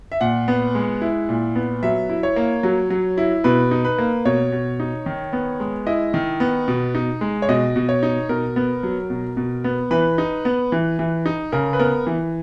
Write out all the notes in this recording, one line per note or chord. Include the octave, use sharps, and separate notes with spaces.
E5
A#2 F#5
B3
G#3
E4
A#2
B3
F#3 E5
E4
C#5
A#3
F#3
F#3
E4
B2 B4
D#4
B4
A#3
B2 C#5
B2
D#4
D#3
B3
G#3
E4 D#5
D#3
B3
B2
D#4
G#3
C#5
B2 D#5
B2
C#5
D#4
B2 A#4
B3
F#3
B2
B2
B3
E3 B4
D#4
B3
E3
E3
D#4
C#3 A#4
B4
B3 A#4
E3